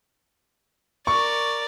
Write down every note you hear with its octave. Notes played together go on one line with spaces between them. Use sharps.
A#4 D5 C#6